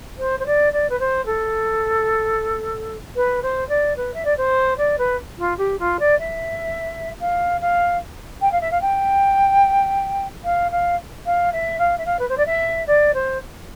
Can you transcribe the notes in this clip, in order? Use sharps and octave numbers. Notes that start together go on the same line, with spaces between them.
C5
C5
D5
D5
B4
C5
A4
B4
C5
D5
B4
E5
D5
C5
D5
B4
F4
G4
F4
D5
E5
F5
F5
G5
F5
E5
F5
G5
F5
F5
F5
E5
F5
E5
F5
B4
C5
D5
E5
D5
C5